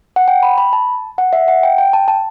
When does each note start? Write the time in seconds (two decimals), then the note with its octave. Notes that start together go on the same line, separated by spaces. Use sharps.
0.16 F#5
0.28 G5
0.43 B5
0.58 B5
0.73 A5
1.18 F#5
1.33 E5
1.48 F#5
1.63 G5
1.78 G5
1.93 A5
2.08 A5